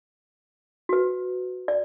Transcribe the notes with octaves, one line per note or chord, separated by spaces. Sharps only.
F#4 B4
D5